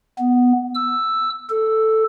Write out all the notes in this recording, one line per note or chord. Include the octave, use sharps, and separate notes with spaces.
B3
E6
A4